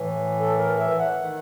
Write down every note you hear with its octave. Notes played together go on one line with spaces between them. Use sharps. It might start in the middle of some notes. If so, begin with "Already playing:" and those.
Already playing: A2 E3
A4
A#4
E5
F#5
D#3